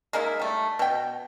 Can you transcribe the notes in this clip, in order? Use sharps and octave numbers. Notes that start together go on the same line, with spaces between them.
G#3 A#3 D#4 E4
G3 A3
B2 G5